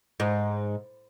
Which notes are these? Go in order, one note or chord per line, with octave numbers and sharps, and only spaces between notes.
G#2